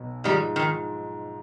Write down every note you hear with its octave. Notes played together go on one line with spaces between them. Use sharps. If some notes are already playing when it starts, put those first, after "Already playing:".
Already playing: B1 B2 B3
G#2 D#3 F3 G3 G#3
D#3